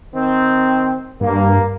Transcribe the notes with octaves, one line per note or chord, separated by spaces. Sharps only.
D#3 C4
G2 A#3